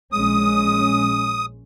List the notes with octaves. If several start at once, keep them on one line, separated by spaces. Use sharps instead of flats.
A#1 G#3 C#4 D#6